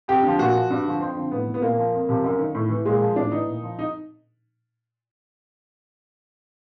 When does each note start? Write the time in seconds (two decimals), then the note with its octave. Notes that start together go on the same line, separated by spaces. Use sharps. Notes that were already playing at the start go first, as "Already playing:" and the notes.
0.08 F2 G4
0.23 D3 F3
0.39 A#2 F#4
0.55 F3
0.70 G2
0.85 D3 F3
1.00 F2 C4
1.16 D3 F3
1.32 A2 B3
1.47 E3
1.54 B3
1.62 A#2 A#3
1.78 F3
1.93 F2
2.09 C3 F3
2.24 F#2
2.39 D#3
2.55 A2
2.70 E3
2.86 A#2 G#3
3.01 F3
3.16 A2 D4
3.32 E3 D#4
3.47 A#2
3.63 F3
3.79 D#4